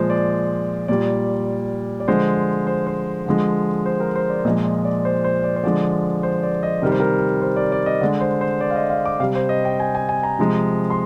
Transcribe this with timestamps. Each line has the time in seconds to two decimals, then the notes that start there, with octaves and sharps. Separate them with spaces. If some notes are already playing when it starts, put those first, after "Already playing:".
Already playing: A#2 F3 G#3 C5
0.10 D5
0.88 A#2 G3 D5
2.00 D5
2.08 D3 F3 G#3 C5
2.67 C5
2.87 C5
3.26 D3 F3 G#3
3.86 C5
4.00 A#4
4.16 C5
4.30 D5
4.45 A#2 D#5
4.47 F3 G#3
4.64 D#5
4.85 D5
5.05 C5
5.24 C5
5.44 D5
5.56 C5
5.63 D3 F3 G#3 D5
6.23 C5
6.43 D5
6.63 D#5
6.82 C3 D#3 G3 A#4
6.91 C5
7.00 A#4
7.42 C5
7.56 D5
7.72 D5
7.86 D#5
8.01 D3 D5
8.04 G#3
8.21 C5
8.41 C5
8.61 D5
8.71 F5
8.76 D#5
8.90 F5
9.05 D6
9.20 C3 F5
9.23 G3
9.35 C5
9.49 D#5
9.65 G5
9.80 G#5
9.95 G#5
10.09 G#5
10.23 A#5
10.39 C3 F3 G#3
10.90 C6